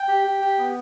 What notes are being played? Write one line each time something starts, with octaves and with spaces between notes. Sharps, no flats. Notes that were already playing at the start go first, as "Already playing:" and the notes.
Already playing: G5
G4
G4
G4
B3